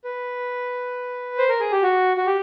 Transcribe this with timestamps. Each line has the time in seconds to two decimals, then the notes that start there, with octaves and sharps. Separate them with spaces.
0.04 B4
1.38 C5
1.49 A#4
1.60 G#4
1.72 G4
1.83 F#4
2.17 F#4
2.26 G4